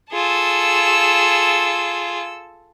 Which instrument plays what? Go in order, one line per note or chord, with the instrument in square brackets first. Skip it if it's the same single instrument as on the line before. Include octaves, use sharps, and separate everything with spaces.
[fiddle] F4 G#4 [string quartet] A4 E6